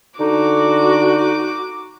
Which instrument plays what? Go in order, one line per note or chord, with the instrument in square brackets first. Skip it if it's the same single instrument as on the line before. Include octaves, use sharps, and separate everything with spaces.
[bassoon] D3 [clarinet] D#4 [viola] F#4 [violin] D6